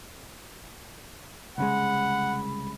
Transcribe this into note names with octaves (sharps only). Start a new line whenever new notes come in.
C2 C#3 G#3 F#5 B5